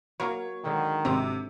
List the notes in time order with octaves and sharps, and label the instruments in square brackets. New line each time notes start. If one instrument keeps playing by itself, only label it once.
[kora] F#3 [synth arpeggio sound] A#3 A#4 [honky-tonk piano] C#5
[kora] G#2 D3 F#3 [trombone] D#3
[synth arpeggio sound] G#1 C4 A#5 [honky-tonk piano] C3